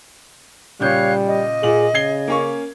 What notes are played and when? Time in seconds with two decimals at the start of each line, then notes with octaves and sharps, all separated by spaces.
0.80 A#2 C#3 G3 C#5 F5 F#6 G6
1.25 D#5
1.63 A#2 G#4 F#7
1.94 C#3 G#6 C7 G7
2.28 A#3 C#4 C#6